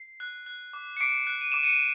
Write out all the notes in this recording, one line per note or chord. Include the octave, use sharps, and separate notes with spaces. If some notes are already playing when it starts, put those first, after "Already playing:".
Already playing: C7
F#6
F#6
D6
C#7
D6 C7 D7
F#6
D#7
D6 E7
C#7 D#7